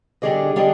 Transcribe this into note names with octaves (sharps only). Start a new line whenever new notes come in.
D3 G3 D4 G#4 D#5
D3 G3 D4 G#4 D#5